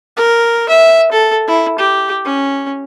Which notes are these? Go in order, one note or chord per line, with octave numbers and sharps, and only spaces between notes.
A#4
E5
A4
E4
G4
C#4